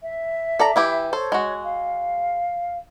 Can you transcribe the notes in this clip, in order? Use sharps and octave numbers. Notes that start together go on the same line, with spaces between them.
E5
A4 D5 A#5
E3 E4 G4
A4 C5 C#5
G#3 F#4
F5